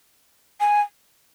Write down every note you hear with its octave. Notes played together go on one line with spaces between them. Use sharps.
G#5